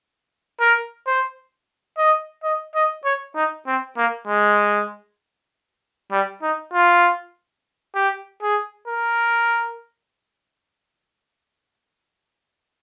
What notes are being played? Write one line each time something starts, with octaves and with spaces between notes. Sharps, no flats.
A#4
C5
D#5
D#5
D#5
C#5
D#4
C4
A#3
G#3
G3
D#4
F4
G4
G#4
A#4